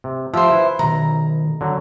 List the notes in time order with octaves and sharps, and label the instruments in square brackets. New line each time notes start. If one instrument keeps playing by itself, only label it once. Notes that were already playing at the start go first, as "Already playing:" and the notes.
[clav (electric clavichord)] C3
[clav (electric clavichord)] F3 G4 [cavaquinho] C5 E5
[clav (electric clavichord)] E4 B4
[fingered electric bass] B2 D#3 [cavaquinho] A#5
[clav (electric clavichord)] D3 F#3